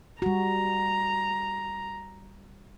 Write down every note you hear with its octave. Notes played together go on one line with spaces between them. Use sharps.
G3 F#4 A#5